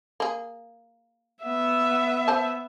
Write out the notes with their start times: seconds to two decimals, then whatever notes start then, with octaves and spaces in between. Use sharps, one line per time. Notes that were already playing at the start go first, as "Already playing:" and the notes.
0.20 A#3 G#4
1.44 B3 E5
2.28 C5 A5